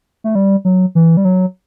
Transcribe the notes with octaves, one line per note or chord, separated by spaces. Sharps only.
A3
G3
F#3
E3
G3
F#3